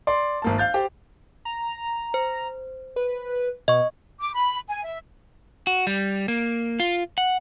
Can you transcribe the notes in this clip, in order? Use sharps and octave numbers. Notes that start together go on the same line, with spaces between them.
D5 C6
G#1 A#3 A5
F5 G6 A6
G4 C5
A#5
C5
B4
B2 D#5 C#6
D6
B5
G#5
E5
F#4
G3
A#3
F4
F#5